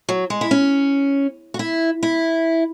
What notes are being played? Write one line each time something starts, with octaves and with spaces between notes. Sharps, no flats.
F#3
G#3
E4
C#4
F#4
E4
E4